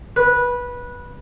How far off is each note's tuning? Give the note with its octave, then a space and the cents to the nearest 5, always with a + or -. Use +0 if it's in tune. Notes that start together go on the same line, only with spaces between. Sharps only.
B4 -15